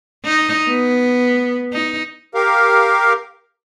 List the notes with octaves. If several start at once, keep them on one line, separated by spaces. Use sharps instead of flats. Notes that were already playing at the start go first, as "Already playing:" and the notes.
D#4
B3
D#4
G4 A#4 F5